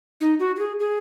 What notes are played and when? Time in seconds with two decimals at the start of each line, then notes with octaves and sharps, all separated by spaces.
0.21 D#4
0.40 F#4
0.56 F#4
0.59 G#4
0.80 G#4